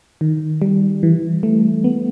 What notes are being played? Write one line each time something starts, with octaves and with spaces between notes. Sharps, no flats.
D#3
G3
E3
A3
B3